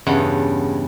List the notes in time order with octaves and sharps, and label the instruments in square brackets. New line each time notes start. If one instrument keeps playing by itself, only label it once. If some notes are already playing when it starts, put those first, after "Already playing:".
[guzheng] E2 G2 C#3 F#5